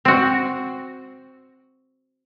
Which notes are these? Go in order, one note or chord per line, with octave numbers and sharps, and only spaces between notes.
C4 F#4